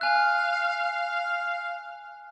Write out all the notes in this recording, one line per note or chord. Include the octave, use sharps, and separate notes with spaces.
F5 G#5 F#6